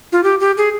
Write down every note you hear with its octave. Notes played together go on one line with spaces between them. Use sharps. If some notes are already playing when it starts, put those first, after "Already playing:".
F4
G4
G4
G#4